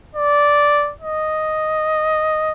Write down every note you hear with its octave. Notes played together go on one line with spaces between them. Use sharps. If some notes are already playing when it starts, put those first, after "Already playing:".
D5
D#5